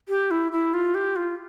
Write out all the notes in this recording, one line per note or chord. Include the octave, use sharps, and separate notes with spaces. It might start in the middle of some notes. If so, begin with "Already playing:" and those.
G4
E4
E4
F4
G4
F4